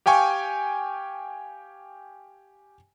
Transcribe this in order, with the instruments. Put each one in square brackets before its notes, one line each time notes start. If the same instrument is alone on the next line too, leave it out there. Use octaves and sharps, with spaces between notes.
[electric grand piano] G4 F5 G5 G#5 C#6